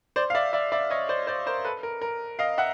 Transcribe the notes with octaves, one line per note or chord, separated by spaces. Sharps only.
C5 D5
F5
D5 E5
D5 E5
D5 E5
C#5 D#5
C5 D5
C5 D5
A#4 C5
A4 B4
A#4
A#4
D#5 F5
E5 F#5